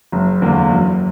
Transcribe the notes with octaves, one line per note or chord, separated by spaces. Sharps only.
F#1
E2 D3 A#3
F#2